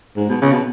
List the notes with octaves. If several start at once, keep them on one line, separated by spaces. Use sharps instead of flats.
G#2
B2
C#3
B2